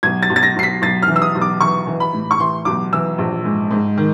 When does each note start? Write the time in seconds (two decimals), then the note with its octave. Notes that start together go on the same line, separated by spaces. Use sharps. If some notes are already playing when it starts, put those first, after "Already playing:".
0.03 B1 G#6
0.23 A6
0.30 B1
0.36 A6
0.43 A#6
0.56 B1 C7
0.63 B6
0.82 B1 A6
1.02 F6
1.08 E3
1.16 E6
1.22 D#6
1.35 B1
1.41 D6
1.61 E3 C#6
1.87 E3
2.00 B5
2.13 A2
2.31 C#6
2.39 E3 C6
2.65 B1 D6
2.92 E3 E6
3.18 A#1
3.45 G#2
3.71 G#2
3.97 D#3